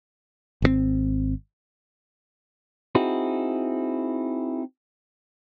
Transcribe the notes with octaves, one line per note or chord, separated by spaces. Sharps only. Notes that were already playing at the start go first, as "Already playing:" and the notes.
G#1 C3 C4
C4 D#4 E4 F#4 G#4